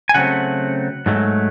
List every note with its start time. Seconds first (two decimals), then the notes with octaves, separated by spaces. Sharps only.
0.09 G#5
0.14 C#3 F#3 A3 C4 F#5
1.06 G#2 F#3 A3